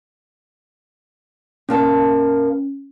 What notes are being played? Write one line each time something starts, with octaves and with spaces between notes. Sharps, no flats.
A#2 A#3 C#4 A5